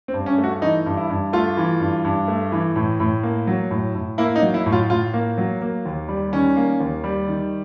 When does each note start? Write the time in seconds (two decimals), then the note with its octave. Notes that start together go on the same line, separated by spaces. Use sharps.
0.08 C4
0.14 G2
0.26 C#4
0.38 A3
0.44 F#4
0.61 E3 D#4
0.86 G2
0.97 E4
1.10 G2
1.33 A3 F4
1.57 E3
1.80 G2
2.05 G2
2.28 A3
2.52 E3
2.76 A2
3.00 A2
3.23 A#3
3.47 F#3
3.71 A2
3.95 A2
4.18 A#3 E4
4.36 D#4
4.42 F#3
4.54 E4
4.66 A2
4.72 F4
4.90 A2 F4
5.14 A#3
5.38 F#3
5.61 A#3
5.85 D#2
6.09 G3
6.33 D#3 C#4
6.56 A#3
6.80 D#2
7.04 G3
7.28 D#3